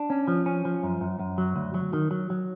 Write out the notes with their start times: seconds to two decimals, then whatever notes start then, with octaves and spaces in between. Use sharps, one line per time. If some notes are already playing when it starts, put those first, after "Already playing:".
Already playing: D4
0.10 C#4
0.28 F3
0.46 C#4
0.65 F3
0.83 F#2
1.01 F#2
1.19 F#2
1.38 F#3
1.56 D2
1.74 F#3
1.93 D#3
2.11 F#3
2.30 F#3